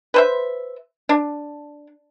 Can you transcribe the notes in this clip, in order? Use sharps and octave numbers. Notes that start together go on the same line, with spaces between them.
B4 C5 E5
D4